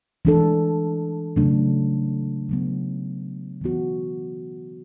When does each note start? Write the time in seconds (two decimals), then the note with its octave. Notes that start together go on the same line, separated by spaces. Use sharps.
0.25 E3 G#3 D4 A4
1.36 C#3 F#3 A3 D4
2.49 C#3 F#3 B3
3.61 E3 B3 F#4